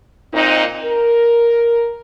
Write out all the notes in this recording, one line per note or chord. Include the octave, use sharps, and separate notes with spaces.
A#2 C4 D#4
A#4